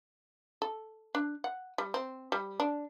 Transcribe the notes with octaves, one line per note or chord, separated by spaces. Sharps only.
A4
D4
F#5
G3
C4
G3
D4